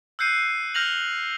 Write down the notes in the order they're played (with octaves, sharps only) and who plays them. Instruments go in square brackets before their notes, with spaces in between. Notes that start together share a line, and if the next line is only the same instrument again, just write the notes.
[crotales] E6 F#6 G6 C7 C#7 D#7
F6 G6 A#6 F7 F#7